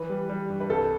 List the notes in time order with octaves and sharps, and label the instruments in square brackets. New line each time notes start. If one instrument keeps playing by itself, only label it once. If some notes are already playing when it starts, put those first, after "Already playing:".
Already playing: [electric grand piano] E3 [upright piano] B4
[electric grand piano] G3
G3
G2
[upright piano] B4
[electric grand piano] C2 [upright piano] A4